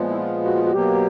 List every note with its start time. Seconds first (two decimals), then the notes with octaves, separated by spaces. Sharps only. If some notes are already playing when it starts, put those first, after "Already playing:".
Already playing: A#2 F3 G#3 B3
0.09 E4
0.17 F4
0.45 F#4
0.56 F4
0.64 F#4
0.72 B2 F#3 A#3 G4